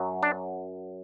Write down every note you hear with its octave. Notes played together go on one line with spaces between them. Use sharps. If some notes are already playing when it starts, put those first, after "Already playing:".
Already playing: F#2 F#3
D4